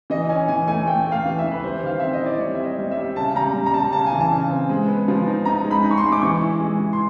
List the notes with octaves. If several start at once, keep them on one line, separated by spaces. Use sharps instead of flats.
E3 D#5
C#4 G#5
E3 G#5
A3 G#5
A3 G5
A3
F5
E3
E5
E3
B4
G3 C5
D#3 F5
C4 E5
D#5
E4 D5
G3 C#5
C4 E5
D#5
G3
E5
G3
C#3 A5
G3 A#5
G3
A#5
G3 A5
C#3 A5
G#5
E3
A5
C#3
C4
G#3
B3
F3
D#4
D#4 A#5
G#3
B5
D#4
C#6
C6
G#3
D6
E3 C#6
E4
G#3
E3
C6